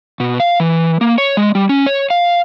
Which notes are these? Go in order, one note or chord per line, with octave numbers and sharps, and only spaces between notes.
B2
F5
E3
A#3
C#5
G#3
G3
C#4
C#5
F5